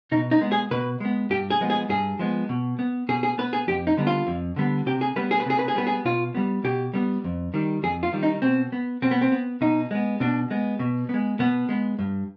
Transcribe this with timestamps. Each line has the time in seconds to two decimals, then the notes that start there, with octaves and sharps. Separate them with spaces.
0.12 B2 D#4
0.31 D#4
0.41 G#3 B3
0.52 G#4
0.71 B2 B4
1.00 G#3 B3
1.30 G2 G4
1.50 G#4
1.60 F3 G#3 B3
1.70 G#4
1.89 G2 G#4
2.19 F3 G#3 B3
2.49 B2
2.79 B3
3.09 B2 G#4
3.23 G#4
3.38 B3 B4
3.53 G#4
3.67 F2 G4
3.87 D#4
3.97 D3 G3 B3
4.07 F4
4.27 F2
4.56 D3 G3 B3
4.86 C3 G4
5.01 G#4
5.16 G3 B3 B4
5.31 G#4
5.40 B4
5.46 C3 G#4
5.59 B4
5.68 G#4
5.75 G3 B3 B4
5.87 G#4
6.05 B2 F4
6.35 G3 B3
6.64 B2 G4
6.94 G3 B3
7.24 F2
7.54 D#3 G3
7.83 F2 G#4
8.03 F4
8.12 D#3 G3
8.23 D#4
8.42 B2 C4
8.72 B3
9.02 B2 C4
9.11 B3
9.21 C4
9.32 B3
9.61 B2 D#4
9.91 G#3 B3
10.20 B2 D4
10.51 G#3 B3
10.79 B2
11.09 G#3 B3
11.39 B2 B3
11.69 G#3 B3
11.99 G2